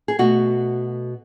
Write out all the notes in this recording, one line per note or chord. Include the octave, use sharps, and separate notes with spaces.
G#4
B2 A3 F#4